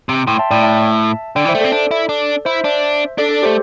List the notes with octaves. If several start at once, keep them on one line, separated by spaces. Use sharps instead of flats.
C3
A2 G5 C6
E5 A5
A2 D5 G5
E5 A5
D3 D5 G5
E3
C5 E5
A3
C4 A4 D5
D4
E4
D4
E4 C5 E5
D4
D4 A4 D5
A4
A3 G4 C5